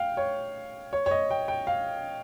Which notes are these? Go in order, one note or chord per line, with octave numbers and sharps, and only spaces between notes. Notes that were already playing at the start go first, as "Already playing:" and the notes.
Already playing: F5 G5
C#5
C#5
C#5
D#5
G5
G5
F5